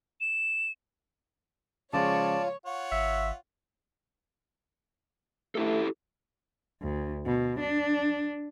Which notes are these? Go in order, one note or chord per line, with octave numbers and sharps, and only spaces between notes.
E7
C#3 F3 G#3 F4 C#5 D5 A5
F4 C#5 F#5
G#1 E5
A3 E4 G4 A4
D2
B2
D4